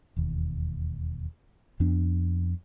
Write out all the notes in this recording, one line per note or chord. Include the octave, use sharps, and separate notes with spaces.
E1 D#2
F2 F3 B3 D4